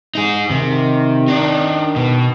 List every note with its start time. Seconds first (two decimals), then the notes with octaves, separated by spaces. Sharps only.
0.15 D#4 G#4
0.51 C3 D#3
1.28 D4 D#4
1.96 B2